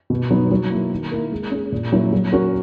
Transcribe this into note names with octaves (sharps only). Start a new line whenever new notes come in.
B2
F#3 B3 D#4
F#3
A#3 E4 A#4
D#3
A#3 E4 A#4
G#3
C#4 G#4
A#2
F#3 A#3 C#4 E4
F#3
C#4 F#4 A#4